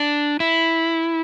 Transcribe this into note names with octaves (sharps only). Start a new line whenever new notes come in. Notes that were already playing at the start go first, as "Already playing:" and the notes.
Already playing: D4
E4